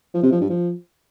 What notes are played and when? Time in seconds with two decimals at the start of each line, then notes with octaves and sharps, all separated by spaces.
0.14 F3
0.23 C3
0.32 F3
0.41 G2
0.50 F3